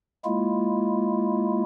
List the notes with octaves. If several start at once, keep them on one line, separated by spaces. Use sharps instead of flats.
G#3 A#3 E4 F4